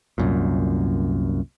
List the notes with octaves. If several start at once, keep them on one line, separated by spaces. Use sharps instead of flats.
C2 F#2 A#2